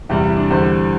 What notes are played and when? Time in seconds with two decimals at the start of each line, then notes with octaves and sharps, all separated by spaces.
0.09 E2 C3 G3 E4
0.23 E4
0.37 D4
0.51 E2 D3 G3 C5